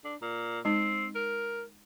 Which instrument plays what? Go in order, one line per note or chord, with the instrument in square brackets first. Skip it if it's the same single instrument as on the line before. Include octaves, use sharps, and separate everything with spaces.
[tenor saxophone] D4
A#2
[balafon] G#3 D#4 [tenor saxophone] C4
[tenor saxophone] A#4